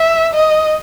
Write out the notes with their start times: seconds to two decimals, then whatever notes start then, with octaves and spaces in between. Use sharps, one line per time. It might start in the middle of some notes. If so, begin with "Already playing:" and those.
Already playing: E5
0.34 D#5